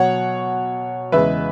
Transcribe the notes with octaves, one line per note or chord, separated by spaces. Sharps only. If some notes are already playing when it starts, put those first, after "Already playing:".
Already playing: B2 F#3 C#5 F#5
E2 C#3 E3 G#3 B4 E5